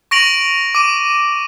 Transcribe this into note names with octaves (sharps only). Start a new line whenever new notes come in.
C#6 A#6 D7 F7 F#7
D6 D#7